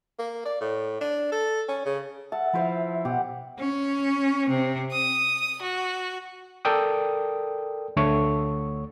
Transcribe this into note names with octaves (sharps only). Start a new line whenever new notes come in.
A#3
D5
A2
D4
A4
C#4
C#3
E5 F#5 A5
F3 E4 B4 C5 F5
B2 G4 F#5
C#4
C3
D#6
F#4
A4 A#4 D5 G5 D#6
D2 D3 A3 C#5 C#6